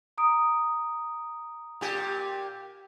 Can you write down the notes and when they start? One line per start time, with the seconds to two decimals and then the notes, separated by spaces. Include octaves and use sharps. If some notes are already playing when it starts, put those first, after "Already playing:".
0.18 A#5 D#6 D7
1.81 A#2 G4